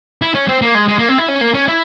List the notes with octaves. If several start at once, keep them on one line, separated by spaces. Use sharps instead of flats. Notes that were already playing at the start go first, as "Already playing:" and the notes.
E4
C#4
C4
A#3
G#3
G#3
A#3
C4
E4
C#4
A#3
C#4
E4